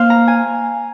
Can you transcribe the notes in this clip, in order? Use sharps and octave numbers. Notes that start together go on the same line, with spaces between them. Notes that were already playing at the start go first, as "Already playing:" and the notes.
Already playing: A#3 C5 F5
A#5
G#5